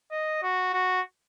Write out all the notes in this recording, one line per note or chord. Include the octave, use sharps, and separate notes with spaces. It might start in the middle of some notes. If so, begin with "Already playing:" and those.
D#5
F#4
F#4